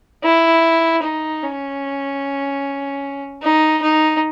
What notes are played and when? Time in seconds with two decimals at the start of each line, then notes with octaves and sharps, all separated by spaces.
0.23 E4
1.03 D#4
1.43 C#4
3.42 D#4
3.82 D#4